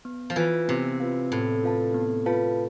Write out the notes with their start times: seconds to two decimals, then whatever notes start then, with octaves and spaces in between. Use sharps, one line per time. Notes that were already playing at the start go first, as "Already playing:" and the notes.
0.05 B3
0.30 F3
0.36 E3 F4 B4 F5
0.68 C3 B3
1.00 F4 B4 F5
1.31 A2 B3
1.64 F4 B4 F5 A5
1.94 B3
2.26 F4 B4 F5 A5